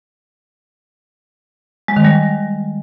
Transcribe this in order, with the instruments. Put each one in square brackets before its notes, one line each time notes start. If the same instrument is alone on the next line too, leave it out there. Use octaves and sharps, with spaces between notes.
[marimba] G#3
D#3
G3